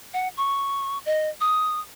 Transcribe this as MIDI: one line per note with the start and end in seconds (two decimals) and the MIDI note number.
0.14 0.28 78
0.37 0.98 85
1.06 1.29 75
1.41 1.80 87